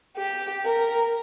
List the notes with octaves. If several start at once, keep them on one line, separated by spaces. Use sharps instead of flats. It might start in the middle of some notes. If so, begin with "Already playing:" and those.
G4
A#4